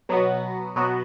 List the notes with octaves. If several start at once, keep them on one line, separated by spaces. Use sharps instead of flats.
B2 F#3 B3 F#4
B2 F#3 B3 F#4